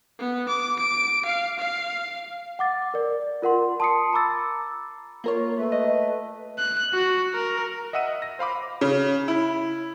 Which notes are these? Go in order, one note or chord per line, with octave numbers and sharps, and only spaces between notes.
B3
D6
D7
F5
F5
F#5 D6 A6
A#4 D5
F4 A#4 F#5 C6
A5 C6 D#6 C7 C#7
A#5 B5 D6 E6 A6
A#3 F4 A#4 C#5
A3 B4
D#5
F#6
F#4
A#4
D#5 E5 F#5 E6 D#7
A#6
C5 F5 B5 D6
C#3
E4